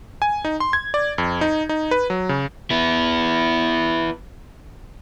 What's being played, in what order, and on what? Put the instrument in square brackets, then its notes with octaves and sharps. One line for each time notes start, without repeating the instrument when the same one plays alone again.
[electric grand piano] G#5
D#4
C6
G#6
D5
F2
D#4
D#4
B4
F#3
C#3
[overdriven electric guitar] B3 E4